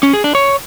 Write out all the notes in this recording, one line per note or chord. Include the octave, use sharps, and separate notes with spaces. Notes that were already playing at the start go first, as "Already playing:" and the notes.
C#4
G#4
D4
C#5